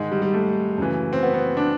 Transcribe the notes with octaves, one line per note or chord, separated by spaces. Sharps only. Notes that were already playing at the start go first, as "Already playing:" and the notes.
Already playing: G#2 D#3 G#3
G3
G3
A3
F#2 C#3 E3
C4
B3
B3
D4